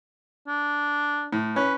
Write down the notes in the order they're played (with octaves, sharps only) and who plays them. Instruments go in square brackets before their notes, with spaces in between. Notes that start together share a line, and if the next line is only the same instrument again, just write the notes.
[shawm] D4
[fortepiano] A2
[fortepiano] C#4 [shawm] B4